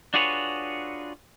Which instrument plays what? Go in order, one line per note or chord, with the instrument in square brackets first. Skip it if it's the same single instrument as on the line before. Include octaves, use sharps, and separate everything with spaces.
[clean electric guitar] D4 F4 F#4 G#4 B4 C#5